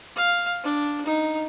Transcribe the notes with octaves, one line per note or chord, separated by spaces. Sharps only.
F5
D4
D#4